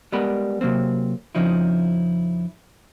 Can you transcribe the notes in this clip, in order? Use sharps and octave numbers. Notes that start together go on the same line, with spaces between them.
G3 G#3 B3 A#4 B5
C3 F#3 A#3 C4
F2 C#3 F3 D#4 E4